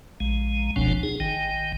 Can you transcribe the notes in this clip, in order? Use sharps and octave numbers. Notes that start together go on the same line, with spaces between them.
A#1 G#3
F#1 C#2 B2 F3 C4 D4
D#4 G#4
G#1 D#3 G5